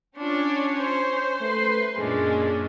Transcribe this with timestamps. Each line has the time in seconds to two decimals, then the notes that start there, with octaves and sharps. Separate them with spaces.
0.17 C#4 D4 F4 C#5
0.78 C5
1.41 A3 B4 C6
1.97 F#2 A#2 G#3 C#4 D4 G#4